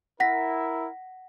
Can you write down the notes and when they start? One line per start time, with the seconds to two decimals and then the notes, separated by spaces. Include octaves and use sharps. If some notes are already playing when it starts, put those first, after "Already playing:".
0.20 E4 A#4 F#5 A#6 B6